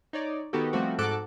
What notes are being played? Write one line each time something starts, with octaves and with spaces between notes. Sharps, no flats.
D#4 C#5 D5
D#3 B3 F#4 G4 A4
F3 G3 A3 C4 F#4 G4
G#2 F#4 A4 D6 F#6 D7